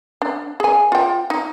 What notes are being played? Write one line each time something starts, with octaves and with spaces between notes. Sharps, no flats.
D4
G#4 G#5
F4 G5
D#4